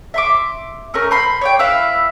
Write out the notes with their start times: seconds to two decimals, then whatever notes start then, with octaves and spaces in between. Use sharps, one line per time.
0.14 E5 C6 D6
0.94 A3 C#4 A#4 C#6
1.11 C5 B5 C6
1.41 C#5 D5 G5
1.59 E4 B4 E5 F5